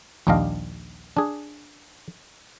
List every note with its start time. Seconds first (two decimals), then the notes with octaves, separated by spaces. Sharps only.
0.27 A#1 D#2 G3 D4 D#5 F5
1.17 D4 G#4